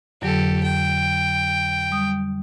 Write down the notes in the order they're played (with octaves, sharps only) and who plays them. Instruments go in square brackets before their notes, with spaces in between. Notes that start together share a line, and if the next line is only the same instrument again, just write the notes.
[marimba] F2 D3 F#3 [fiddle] G4 A4
[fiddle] G5
[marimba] G3 D#6